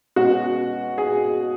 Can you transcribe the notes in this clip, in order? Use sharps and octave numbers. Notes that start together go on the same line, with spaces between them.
B2 G#3 C#4 F#4
G#4